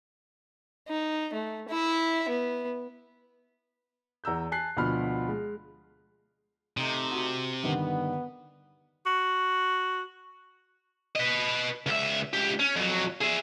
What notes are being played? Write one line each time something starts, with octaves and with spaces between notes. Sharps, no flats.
D#4
A3
E4 E5
B3
E2 A#5 E6 G6
G#5 A5 F#6 C7
D2 B2 F3 B5 F6
G#3
C3 A3 D#4
F#4
G2 D3 D#3 B3
F#4
B4 D#5
C#2 E5
C#2 G4
C#4
F2 F#3
G#4 E5